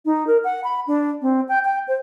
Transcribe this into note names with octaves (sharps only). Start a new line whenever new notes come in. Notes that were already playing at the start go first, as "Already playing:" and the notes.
D#4
A#4
F#5
B5
D4
C4
G5
G5
C5